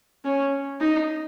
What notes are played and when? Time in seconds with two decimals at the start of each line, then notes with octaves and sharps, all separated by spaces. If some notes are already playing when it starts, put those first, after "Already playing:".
0.25 C#4
0.81 D#4